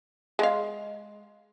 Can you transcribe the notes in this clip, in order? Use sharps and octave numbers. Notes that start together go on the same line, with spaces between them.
G#3 F5